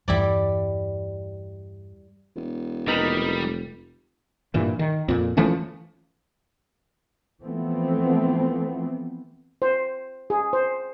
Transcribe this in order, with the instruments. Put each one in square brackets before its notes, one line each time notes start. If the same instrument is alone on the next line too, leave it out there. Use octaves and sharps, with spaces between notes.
[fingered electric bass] E2 G2 [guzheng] G3 E4 D5
[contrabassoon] E1
[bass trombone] F1 [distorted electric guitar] G3 [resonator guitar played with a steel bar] D#4 A#4 B4
[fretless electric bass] G2 A#2 E3
D#3
F2 A#2
E3 F3 A3 C#4
[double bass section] E3 F3 A3 B3 C4
[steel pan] C5
G#4
C5